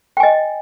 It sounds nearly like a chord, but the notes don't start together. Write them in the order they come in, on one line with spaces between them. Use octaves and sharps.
G5 G#5 D#5